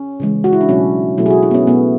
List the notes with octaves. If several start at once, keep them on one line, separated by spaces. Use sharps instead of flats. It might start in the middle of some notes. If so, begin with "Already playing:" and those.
Already playing: C#4
C#3 E3 G#3
F#4
E4
D4
B2 F#3 A3 C#4
B2 F#3 A3 E4
G#4
F#4
E4
B3
C#4
B2 A3 B3